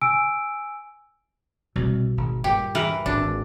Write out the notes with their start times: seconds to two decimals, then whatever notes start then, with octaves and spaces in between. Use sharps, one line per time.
0.01 G#5 E6 D7
1.76 C2 B2 C4
2.17 G#1
2.44 C#2 G2 A#2 G4
2.75 E3 A#4 B4
3.06 G#1 D4